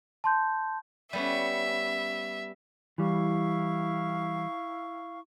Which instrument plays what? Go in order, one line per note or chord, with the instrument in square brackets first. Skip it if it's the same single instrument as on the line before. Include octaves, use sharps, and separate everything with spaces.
[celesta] A5 C6 G6
[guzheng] G3 B3 C#4 [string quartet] E5
[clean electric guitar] E3 G3 [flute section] E4 F5 C#6